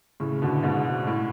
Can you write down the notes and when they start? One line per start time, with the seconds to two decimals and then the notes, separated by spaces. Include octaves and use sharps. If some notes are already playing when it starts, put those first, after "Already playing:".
0.20 A2 C#3
0.42 B2 D3
0.63 G#2 B2
1.07 A2